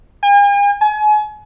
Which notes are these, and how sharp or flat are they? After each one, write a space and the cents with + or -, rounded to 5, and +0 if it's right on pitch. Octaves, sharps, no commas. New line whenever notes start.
G#5 -45
G#5 +35